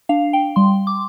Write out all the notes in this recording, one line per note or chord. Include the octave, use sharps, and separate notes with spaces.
D4 F5
G5
G3 C6
D6